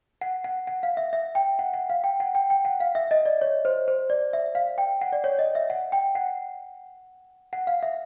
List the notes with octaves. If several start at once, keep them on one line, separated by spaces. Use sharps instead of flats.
F#5
F#5
F#5
F5
E5
E5
G5
F#5
F#5
F5
G5
F#5
G5
G5
F#5
F5
E5
D#5
D5
C#5
C5
C5
D5
E5
F5
G5
F#5
D5
C#5
D#5
E5
F#5
G5
F#5
F#5
F5
E5